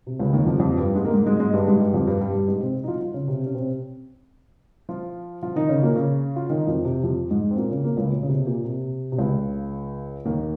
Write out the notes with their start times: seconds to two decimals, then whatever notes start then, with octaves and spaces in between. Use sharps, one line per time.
0.07 C3
0.20 C#2 C#3
0.33 D#2 D#3
0.46 F2 F3
0.54 G3
0.60 F2 F3
0.73 F3
0.77 G2 G3
0.95 G#2 G#3
1.05 A#3
1.13 G#2 G#3
1.27 G#2 G#3
1.40 G#2 G#3
1.54 G2 G3
1.67 G#2 G#3
1.80 G2 G3
1.94 F2 F3
2.07 G2 G3
2.21 G2 G3
2.34 G2 G3
2.48 G#2 G#3
2.61 C3 C4
2.84 D#4
2.88 F3 F4
3.01 F3 F4
3.14 C#3 C#4
3.28 C3 C4
3.46 C#4
3.55 C3 C4
4.89 F3 F4
5.43 F3 F4
5.56 D#3 D#4
5.69 C#3 C#4
5.82 A#2 A#3
5.96 C#3 C#4
6.36 F4
6.50 D#3 D#4
6.67 F2 F3
6.85 C3
7.03 F2 F3
7.30 G#2 G#3
7.51 C4
7.57 A#2 A#3
7.70 C#3 C#4
7.84 A#2 A#3
7.97 C#2 C#3
8.11 A#2
8.23 C#3
8.28 C3
8.47 A#2
8.64 C3
9.12 C3
9.18 C#2 C#3
10.25 D#2 D#3